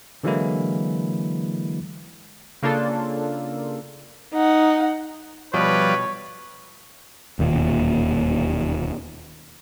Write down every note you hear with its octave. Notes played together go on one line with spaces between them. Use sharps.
D3 E3 F#3 G#3 A#3 E4
C#3 A#3 D4 F4 A4
D#4 F#5
B2 F3 G3 B4 C#5 D5
E1 D#2 A#2